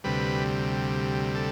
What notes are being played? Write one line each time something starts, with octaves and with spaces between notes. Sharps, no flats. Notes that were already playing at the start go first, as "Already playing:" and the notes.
D2 C3 G3 B4
A4